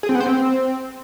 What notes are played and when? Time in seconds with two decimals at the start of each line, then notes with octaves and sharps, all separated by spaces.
0.03 G#4
0.09 C4
0.15 B3
0.21 C5
0.26 C4